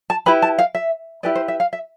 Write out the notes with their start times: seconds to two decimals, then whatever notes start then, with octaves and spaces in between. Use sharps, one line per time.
0.10 A5
0.26 E4 G4 B4 B5
0.42 A5
0.59 F5
0.75 E5
1.23 E4 G4 B4 D5
1.35 C5
1.48 E5
1.60 F5
1.73 E5